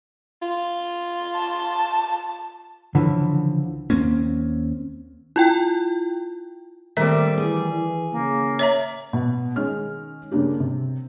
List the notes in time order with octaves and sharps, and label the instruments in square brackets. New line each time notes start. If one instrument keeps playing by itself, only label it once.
[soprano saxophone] F4
[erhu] A5
[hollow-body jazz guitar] C#2 D3 E3 F3
[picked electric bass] D#2 A#3 C4 C#4
[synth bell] E4 F4 G5
[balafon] D#3 E5 [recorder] G3 [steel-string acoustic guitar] A3 A#3 C4
[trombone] E3 [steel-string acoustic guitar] G#4
[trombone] E3
[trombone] C#3 [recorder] A#3
[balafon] C#5 E5 A#5
[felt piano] B2
D#3 G#3 C#4 F6
G2 C#3 A#3 D4 G4
C3